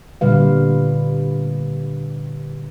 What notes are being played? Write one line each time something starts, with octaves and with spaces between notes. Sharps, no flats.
A#2 D3 G3 B4 F5